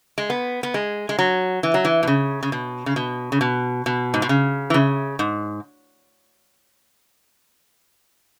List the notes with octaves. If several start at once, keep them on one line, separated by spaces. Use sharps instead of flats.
G#3
B3
B3
G#3
G#3
F#3
E3
F#3
E3
B2
C#3
C#3
B2
C#3
B2
C#3
B2
B2
G#2
B2
C#3
E3
C#3
G#2